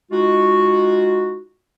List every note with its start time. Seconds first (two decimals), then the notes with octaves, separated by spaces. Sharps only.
0.12 G#3 D#4 F4 F#4